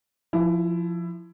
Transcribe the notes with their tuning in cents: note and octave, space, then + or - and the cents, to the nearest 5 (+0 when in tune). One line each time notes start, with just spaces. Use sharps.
F3 -5 E4 +15